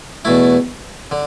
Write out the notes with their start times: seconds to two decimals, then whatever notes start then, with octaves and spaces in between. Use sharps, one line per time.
0.25 E2 B2 A3 E4
1.11 D3